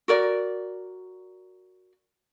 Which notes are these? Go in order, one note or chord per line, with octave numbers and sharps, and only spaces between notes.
F#4 A#4 D5